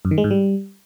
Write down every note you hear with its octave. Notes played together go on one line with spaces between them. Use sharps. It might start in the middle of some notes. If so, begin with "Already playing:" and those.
F#2
D#3
G#3
G#2
G3